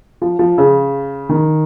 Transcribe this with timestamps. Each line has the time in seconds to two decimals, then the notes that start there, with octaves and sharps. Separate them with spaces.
0.22 F3
0.39 F3
0.58 C#3
1.29 D#3